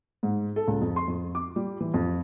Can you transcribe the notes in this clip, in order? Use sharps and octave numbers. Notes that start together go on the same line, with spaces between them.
G#2
A4
C#2
F2
C6
F2
D6
G3
E3
F2